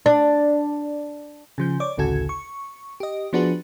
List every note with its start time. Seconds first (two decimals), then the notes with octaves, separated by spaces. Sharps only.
0.06 D4
1.58 C#3 F3 G6
1.80 C#5 D5 D6
1.98 A1 D2 C#3 F#4 A4 G#6
2.29 C#6
3.00 G4 D#5
3.33 F3 B3 D4 F#4 G#4 B4